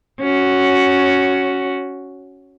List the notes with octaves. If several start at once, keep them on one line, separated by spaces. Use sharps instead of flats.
C#4 F#4